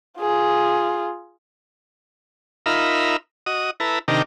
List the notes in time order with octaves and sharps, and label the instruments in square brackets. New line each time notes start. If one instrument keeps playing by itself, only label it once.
[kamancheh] F4 G#4
[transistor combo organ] D#4 F4 A#4 E5 B5
F#4 D#5 D#6
E4 A4 B4 A#5
C3 D#3 D4 D#4 G4 A#4